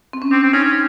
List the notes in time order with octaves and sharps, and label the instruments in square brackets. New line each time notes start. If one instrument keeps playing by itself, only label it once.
[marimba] C4
C#4
[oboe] C4 [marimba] D4
[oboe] C4
[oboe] C#4 [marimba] D#4
[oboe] C#4